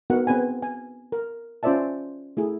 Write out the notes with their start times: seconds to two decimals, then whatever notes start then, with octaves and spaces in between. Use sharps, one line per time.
0.10 B3 D#4 F#4 A#4 F#5
0.27 B3 C4 G#4 B4 G#5
0.63 G#5
1.12 A#4
1.63 C#4 F4 C5 D5 E5 A5
2.37 A3 E4 G#4